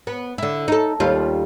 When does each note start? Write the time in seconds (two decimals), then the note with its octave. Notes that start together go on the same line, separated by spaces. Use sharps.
0.07 B3
0.38 D3 E4
0.68 D#4 A4
1.00 D#2 G3 F4